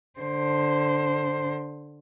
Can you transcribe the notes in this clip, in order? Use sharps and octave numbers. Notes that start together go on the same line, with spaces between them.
D3 C5